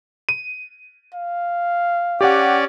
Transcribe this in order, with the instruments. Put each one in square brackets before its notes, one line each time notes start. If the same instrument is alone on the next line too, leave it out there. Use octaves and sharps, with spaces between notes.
[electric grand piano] D#7
[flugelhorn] F5
[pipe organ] C#4 D5 [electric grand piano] G4 F#5